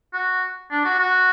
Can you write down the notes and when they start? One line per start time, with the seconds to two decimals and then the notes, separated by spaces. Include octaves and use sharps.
0.14 F#4
0.71 D4
0.85 F#4
0.99 F#4